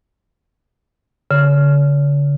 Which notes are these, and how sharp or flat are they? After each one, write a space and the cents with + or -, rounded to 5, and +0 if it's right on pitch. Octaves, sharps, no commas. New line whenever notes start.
D3 -40